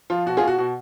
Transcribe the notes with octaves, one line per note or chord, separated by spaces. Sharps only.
F3 F4
B2 F#4
F4 G#4
B2 F#4
B2 F#4